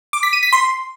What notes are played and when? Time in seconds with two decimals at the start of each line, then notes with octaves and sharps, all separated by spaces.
0.13 D6
0.23 B6
0.33 D#7
0.43 B6
0.53 C6